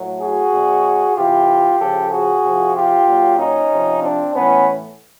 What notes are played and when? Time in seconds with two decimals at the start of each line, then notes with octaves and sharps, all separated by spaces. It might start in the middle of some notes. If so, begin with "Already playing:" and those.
Already playing: A2 F#3
0.21 F#4 G#4
0.52 B2 F#3
1.16 C3 E3 F4 G4
1.79 C#3 F3 G4 A4
2.11 F#4 G#4
2.43 C3 F3
2.75 F4 G4
3.07 A#2 F#3
3.38 C#4 D#4
3.70 C3 F3
4.02 C4 D4
4.34 A2 E3 B3 C#4